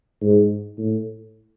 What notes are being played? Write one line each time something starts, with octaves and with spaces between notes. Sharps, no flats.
G#2
A2